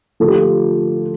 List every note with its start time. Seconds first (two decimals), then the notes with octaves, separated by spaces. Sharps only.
0.20 D3 F3 A3 A4
0.28 G4
0.35 F4
0.42 G4